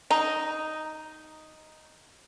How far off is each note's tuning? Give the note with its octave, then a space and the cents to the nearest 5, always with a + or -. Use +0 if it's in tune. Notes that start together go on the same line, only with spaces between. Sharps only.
D#4 +0 A#5 +0